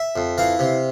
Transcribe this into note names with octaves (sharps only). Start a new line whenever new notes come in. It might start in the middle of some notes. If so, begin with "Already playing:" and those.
Already playing: E5
F2
E3 F5
C3